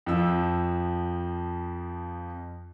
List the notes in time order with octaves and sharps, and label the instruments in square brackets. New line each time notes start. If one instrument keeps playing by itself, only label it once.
[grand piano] F2 F3 E6